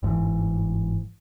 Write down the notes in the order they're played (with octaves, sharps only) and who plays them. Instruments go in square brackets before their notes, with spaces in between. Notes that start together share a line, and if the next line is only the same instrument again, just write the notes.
[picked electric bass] G1 G#2 D3 E3